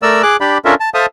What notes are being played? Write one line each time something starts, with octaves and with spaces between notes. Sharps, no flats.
A3 A#4 D5 E6
G#4 D6 F#6
D4 G4 D5 B5
C#4 D4 F4 A4 A#4 E5
A5
A4 C5 E5 F5 A5 D#6